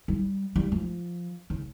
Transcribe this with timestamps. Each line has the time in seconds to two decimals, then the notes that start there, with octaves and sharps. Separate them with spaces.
0.08 G3
0.56 G3
0.72 F3
1.50 C#3